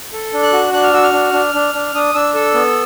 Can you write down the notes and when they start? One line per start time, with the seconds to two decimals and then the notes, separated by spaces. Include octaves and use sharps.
0.13 A4
0.33 D4
0.43 F#6
0.53 F#4
0.73 D4 F#6
0.83 F6
0.93 F#4 E6
1.03 F6
1.13 D4
1.33 D4
1.55 D4
1.74 D4
1.95 D4 D#6
2.14 D4 E6
2.34 A4 E6
2.54 B3